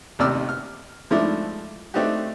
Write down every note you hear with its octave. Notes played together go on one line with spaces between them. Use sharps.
A1 D#2 C3 D5 E6 F6
F6
G#2 F3 G#3 A3 D4 E4
A3 C4 D4 D#4 F#4 G4